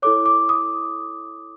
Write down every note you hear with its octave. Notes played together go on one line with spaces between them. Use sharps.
E4 A4 C#5 D6
D6
D#6